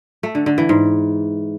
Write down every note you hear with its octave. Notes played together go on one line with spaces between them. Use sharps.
A3
D3
D3
E3
G#2